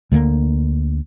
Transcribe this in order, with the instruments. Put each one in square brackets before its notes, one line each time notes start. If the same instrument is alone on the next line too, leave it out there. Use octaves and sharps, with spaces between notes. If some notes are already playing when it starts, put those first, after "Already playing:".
[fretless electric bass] D2 D3 F3 A#3